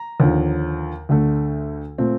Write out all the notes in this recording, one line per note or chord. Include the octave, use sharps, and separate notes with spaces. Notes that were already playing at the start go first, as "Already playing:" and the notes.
Already playing: A#5
D#2 D3 F3
D2 D3 A3
A#2 A3 C4